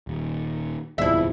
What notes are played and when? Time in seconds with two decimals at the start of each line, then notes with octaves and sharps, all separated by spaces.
0.07 D#1 D#2
0.98 D1 E2 G#2 C3 F3 E4 E5